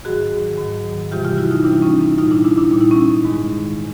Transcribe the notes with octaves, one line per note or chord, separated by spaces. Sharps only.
G#2 D#3 F#3 F#4 G#4
G#2 D#3 F#3
C3 E3 G3 F4 G4
F4 G4
E4 F#4
D#4 F4
C3 E3 G3 D4 E4
C#4 D#4
C#4 D#4
A#2 G3 D#4 F4
D4 E4
D4 E4
D4 E4
A#2 G3 D#4
E4
C#4 D#4
G#2 D#3 G#3
G#3